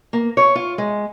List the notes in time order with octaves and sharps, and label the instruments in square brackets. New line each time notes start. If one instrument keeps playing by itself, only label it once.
[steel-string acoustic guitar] A#3
C#5
F4
G#3